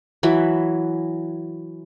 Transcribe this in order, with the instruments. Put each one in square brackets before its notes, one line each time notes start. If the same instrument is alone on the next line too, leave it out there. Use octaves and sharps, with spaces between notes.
[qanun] E3 F#3 E5 B5